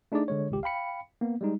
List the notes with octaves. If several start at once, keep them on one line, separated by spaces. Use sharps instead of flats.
A3 D4 D#4 G#4 D5
D3 G#3 C#5
G#1 C#2 G4
F5 G5 B5 C#7
A#3 B3
G3 G#3 D#4